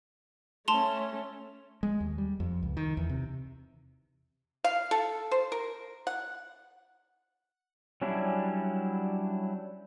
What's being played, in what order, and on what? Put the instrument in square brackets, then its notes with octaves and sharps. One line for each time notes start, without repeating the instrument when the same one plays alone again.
[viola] A3 C#4 [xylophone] A5 C6 F7
[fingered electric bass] G#3
D#2
G3
F2
C#2
D#3
E2
C3
[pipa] F5
A4
C5
A#4
F#5
[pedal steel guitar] F#3 G3 C#4 D4 E4